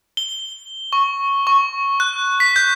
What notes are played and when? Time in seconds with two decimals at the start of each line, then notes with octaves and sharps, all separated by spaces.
0.17 G7
0.93 C#6
1.47 C#6
2.00 F#6
2.40 B6
2.56 G6